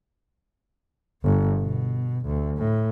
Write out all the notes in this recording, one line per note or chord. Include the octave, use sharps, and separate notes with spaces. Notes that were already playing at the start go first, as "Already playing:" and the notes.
G1
B2
D2
A2